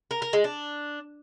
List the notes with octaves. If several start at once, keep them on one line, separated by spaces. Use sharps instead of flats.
A#4
A#4
G#3
D4